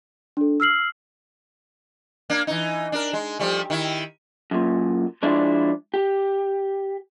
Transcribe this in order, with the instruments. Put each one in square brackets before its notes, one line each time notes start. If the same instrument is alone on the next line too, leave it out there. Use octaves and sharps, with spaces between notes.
[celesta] D4 A4
E6 F6 C7 F#7
[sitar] A#3 D4
E3 D#4
D4 A#4
G#3
F3 G3 A3
D#3 E4
[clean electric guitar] F#2 A#2
F3 G#3 D4 E4 C5 D5
G4